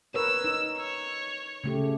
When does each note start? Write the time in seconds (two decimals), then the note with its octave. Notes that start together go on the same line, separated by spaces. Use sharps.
0.14 A#4 B4 C#5 E6
0.44 D#4
0.78 C#5
1.64 C#3 A3 G4